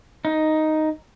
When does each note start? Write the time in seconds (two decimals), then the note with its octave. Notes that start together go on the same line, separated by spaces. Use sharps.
0.25 D#4